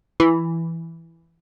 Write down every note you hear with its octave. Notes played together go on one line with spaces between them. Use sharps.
E3